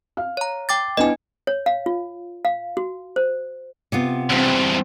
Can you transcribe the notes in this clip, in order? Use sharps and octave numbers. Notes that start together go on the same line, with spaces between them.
F5 F6
C#5 A#5
G5 D6 A6
B3 D4 E4 D#5 G#5
C#5
F5
F4
F5
F#4
C5
C3 B3 F4
E2 G2 C4